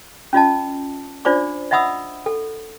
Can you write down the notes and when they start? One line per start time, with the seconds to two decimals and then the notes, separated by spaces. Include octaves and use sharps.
0.33 C#4 F4 D#5 A5
1.25 D4 F4 C5 D5 D6
1.71 D#5 E5 F#5 B5 D#6 E6
2.26 A4